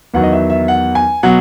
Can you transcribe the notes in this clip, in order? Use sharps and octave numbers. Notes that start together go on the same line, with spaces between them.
E2 D#3 F#3 F#5
D#5
E5
E5
F#5
G#5
B2 F#3 F#5